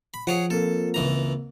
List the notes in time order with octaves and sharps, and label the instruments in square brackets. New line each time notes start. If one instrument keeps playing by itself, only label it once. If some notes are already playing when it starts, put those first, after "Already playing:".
[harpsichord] B5
[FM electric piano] F3 [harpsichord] G#4 C#5 F#5
[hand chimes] A#3 C4 A#4 [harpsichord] A4
[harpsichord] C#2 E3 A#5